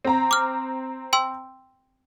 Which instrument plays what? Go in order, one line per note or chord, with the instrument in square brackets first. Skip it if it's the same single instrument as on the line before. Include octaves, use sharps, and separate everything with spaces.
[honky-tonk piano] C4 A#5
[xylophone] D6 F6
G5 C6 E6